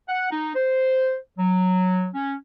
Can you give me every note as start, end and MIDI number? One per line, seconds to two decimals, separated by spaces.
0.09 0.31 78
0.31 0.52 63
0.56 1.16 72
1.38 2.09 54
2.14 2.35 61